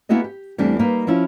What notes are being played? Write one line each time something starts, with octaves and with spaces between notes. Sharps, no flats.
A#3 B3 E4 F#4 G#4 D#5
G4
E2 E3 G3 A3 C4 D4
G3 A#3 D#4 B4 F5
F3 C#4 E4 F4